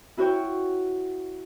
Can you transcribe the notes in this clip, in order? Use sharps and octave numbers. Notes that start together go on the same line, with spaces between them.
E4 F#4 C#5 G5